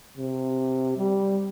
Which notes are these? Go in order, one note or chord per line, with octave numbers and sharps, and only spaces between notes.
C3
G3